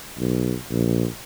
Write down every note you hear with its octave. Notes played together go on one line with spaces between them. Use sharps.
B1
A#1